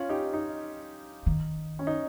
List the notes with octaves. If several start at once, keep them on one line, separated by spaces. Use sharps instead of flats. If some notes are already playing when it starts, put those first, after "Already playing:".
Already playing: C#4 F4
D#4 G4
D#4
D#3
C#4
D#4